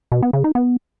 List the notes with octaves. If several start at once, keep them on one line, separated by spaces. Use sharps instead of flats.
B2
B3
C#3
D#4
B3